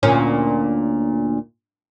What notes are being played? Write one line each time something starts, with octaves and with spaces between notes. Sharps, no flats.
D2 A#2 C#4